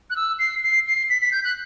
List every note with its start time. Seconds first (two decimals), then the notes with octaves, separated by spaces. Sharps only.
0.10 F#6
0.16 E6
0.39 C7
0.63 C7
0.87 C7
1.10 B6
1.22 B6
1.32 G6
1.44 F#6